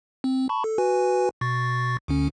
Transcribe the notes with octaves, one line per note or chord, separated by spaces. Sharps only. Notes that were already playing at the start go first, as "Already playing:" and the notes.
C4
A5 B5 C#6
A4
F#4 B4 G#5
B2 C#6 A6
D2 D3 C#4